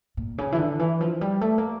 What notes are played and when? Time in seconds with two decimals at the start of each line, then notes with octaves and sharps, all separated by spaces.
0.17 A#2
0.38 C#3
0.52 E3
0.58 D3
0.79 E3
1.01 F3
1.21 G3
1.41 A3
1.58 A#3